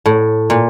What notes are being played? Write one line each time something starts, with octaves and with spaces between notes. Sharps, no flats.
A2
A#2